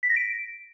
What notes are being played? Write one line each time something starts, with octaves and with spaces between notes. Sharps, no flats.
B6
A#6
D7